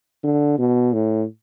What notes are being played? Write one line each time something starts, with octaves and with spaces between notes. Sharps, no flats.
D3
B2
A2